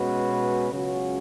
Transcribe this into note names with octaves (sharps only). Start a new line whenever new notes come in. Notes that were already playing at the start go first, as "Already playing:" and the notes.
Already playing: B2 G#3 C#4 F#4 B4
C#2 C#3 F#3 C#4 F#4